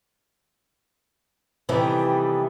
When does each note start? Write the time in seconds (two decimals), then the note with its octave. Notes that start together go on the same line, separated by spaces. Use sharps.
1.69 C3 D#3 E3 G3 A3 B3